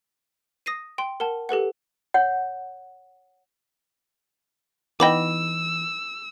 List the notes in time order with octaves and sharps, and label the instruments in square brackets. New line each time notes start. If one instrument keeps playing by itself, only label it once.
[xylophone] D#6 A#6 C7 D#7
G5 C6
A#4 F#5 A5
G4 A4 B4 F#5
[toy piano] C#5 F#5
[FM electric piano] E3 [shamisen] B3 D#4 G5 [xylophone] D#5 B5 D6 [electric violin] E6